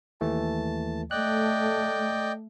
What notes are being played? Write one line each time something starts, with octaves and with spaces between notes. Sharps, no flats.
D#2 E3 A3 A5
A3 D5 D#5 G5 F#6